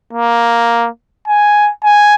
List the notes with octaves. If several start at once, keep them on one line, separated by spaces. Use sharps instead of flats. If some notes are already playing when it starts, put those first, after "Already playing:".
A#3
G#5
G#5